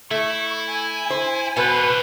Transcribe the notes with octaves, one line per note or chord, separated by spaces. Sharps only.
A3 E4 C#6
G#5
C5 G#5
B2 A4 B4 C5